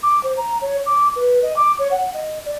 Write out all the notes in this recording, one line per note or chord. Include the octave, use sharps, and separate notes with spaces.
D6
C5
A#5
C#5
D6
B4
D#5
D6
C#5
F#5
D#5
D5